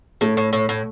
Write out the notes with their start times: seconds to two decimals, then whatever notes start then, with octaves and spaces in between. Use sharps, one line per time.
0.21 A2 A3
0.37 A2
0.53 A2
0.69 A2